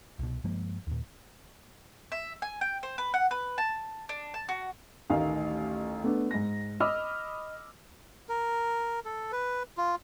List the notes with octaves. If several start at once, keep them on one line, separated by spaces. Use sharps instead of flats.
C2 B2
G2 F3 G#3 A#3
D#2 A#2
E5
G#5
G5
C5
B4
F#5
B4
A5
D4
A5
F#4
A1 D2 D#3 F5
A3 B3 D4
G#2 A#6
D#5 B5 D6 E6 F6
A#4
A4
B4
F4